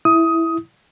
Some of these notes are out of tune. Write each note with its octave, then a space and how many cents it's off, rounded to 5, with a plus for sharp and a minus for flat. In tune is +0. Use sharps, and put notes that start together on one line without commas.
E4 +0 D#6 +15